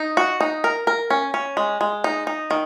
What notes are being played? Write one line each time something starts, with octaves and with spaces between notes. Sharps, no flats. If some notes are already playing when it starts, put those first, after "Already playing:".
Already playing: D#4
F#4
D#4
A#4
A#4
C#4
C#4
G#3
G#3
D#4
D#4
D#3